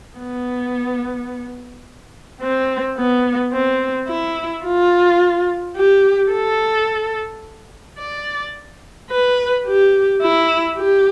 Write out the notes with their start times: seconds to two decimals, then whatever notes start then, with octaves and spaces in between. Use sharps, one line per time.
0.18 B3
2.41 C4
2.97 B3
3.53 C4
4.08 E4
4.64 F4
5.76 G4
6.32 A4
7.99 D5
9.10 B4
9.66 G4
10.22 E4
10.78 G4